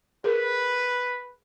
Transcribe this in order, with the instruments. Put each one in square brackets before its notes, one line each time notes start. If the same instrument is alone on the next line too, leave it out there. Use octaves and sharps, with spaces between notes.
[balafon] G#4 A#4 [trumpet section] B4